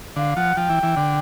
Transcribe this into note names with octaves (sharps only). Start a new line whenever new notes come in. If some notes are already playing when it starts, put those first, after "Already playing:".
D3 F5
F3 F#5
F3 G5
E3
E3
D3